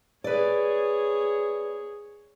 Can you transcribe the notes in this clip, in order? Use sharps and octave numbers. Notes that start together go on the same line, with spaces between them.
G#4 B4 C#5 D5